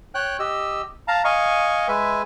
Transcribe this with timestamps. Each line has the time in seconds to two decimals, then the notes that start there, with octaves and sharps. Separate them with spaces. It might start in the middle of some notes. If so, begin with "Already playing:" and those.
0.15 C#5 G5 F#6
0.39 G4 D#5 E6
1.08 F5 A5 A#5
1.25 D#5 F5 G#5 C#6
1.88 G#3 B4 E5 G#5